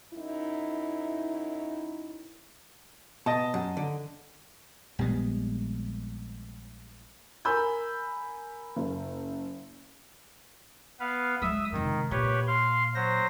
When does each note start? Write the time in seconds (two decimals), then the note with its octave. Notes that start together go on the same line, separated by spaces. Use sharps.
0.14 F#2 D#4 E4
3.26 B2 D#5 A5
3.54 F#2
3.77 D3
4.99 A#1 G3 G#3 B3
7.45 A#4 G#5 B5 E6 G6
8.77 F#1
11.00 B3 B4 F5
11.42 F#3 G#3 E5 D#6 E6
11.72 F1 G#2 D#3
12.11 A#2 G4 B4 C#5
12.47 F5 C6
12.95 F#3 C5 A#6